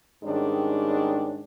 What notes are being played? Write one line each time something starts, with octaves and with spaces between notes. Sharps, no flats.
G#2 D#3 G3 G#3 C#4 D4